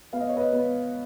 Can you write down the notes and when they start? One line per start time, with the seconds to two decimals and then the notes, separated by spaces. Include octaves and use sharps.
0.13 B3 F5
0.20 D#5
0.29 C#5
0.37 B4 D#5
0.53 B3